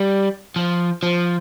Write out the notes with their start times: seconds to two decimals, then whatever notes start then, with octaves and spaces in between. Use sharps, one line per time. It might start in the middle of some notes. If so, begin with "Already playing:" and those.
Already playing: G3
0.56 F3
1.03 F3